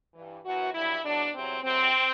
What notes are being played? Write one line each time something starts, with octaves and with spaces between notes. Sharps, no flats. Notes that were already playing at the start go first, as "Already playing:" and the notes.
G2 E3
F#2 E3 F#4
G2 D3 F#3 E4
E2 B2 F#3 D4
E2 C3 F#3 C4
D2 C3 F#3 C4